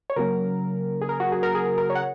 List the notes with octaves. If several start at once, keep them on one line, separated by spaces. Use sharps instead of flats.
C#5
C#3 F#3 A#3 C#4 A#4
G#4
A#4
F#4
G#4
A#4
G#4
G#4
A#4
C#5
F#5